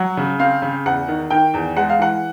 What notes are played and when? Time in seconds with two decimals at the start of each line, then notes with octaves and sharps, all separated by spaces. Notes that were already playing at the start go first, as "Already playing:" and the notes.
Already playing: F#3 F#5
0.17 C#3
0.39 C4 F5
0.62 C#3
0.86 E2 F#5
1.08 D#3
1.30 D#3 G5
1.54 E2
1.76 G#3 F#5
1.89 F5
1.99 E3 F#5